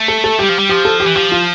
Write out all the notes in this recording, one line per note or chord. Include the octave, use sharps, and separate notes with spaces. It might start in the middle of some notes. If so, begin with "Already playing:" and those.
Already playing: A3
A4
A4
G3 G4
F3
G3
F3 G4
A4
G4
E3
F3 G4
F4